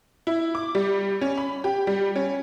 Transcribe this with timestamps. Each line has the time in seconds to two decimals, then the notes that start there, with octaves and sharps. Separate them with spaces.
0.27 E4
0.55 D6
0.75 G3
1.21 C#4
1.38 B5
1.64 G4
1.87 G3
2.16 C#4